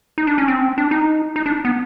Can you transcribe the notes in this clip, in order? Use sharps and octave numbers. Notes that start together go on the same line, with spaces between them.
D#4
D4
C#4
C4
D4
D#4
D#4
D4
B3